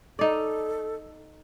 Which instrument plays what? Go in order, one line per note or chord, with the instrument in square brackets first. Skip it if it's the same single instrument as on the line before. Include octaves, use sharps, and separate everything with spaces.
[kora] D#4 D5 [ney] A4